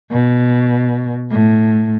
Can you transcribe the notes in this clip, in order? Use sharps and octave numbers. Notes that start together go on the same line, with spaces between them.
B2
A2